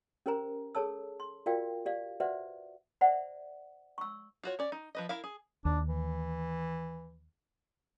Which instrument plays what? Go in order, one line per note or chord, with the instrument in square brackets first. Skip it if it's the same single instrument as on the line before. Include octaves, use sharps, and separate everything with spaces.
[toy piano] C#4 G4 A#4 C5 G#5 A#5
G#4 A4 C#5 A5 E6
C6
F4 F#4 A#4 D5 F5 G5
G4 D5 F5
F#4 B4 C5 D5 E5 F#5
C5 D5 E5 F#5
C#6 E6
[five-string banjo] F4 F#4 C#5
C#4 D5
D#4
F3 B4 D#5
E4 A#4 F5
G#4
[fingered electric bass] D#2 [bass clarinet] D4
[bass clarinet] E3